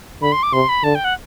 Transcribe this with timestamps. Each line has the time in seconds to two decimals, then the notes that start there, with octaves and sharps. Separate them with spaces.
0.22 D3 B5
0.32 C6
0.43 D6
0.53 C3 C6
0.69 B5
0.84 D3 A5
0.95 G5
1.04 F#5